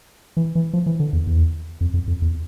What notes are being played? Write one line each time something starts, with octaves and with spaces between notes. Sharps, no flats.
E3
E3
F3
E3
D3
E2
E2
F2
F2
F2
E2